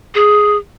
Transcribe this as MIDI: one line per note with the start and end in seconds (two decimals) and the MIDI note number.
0.15 0.57 68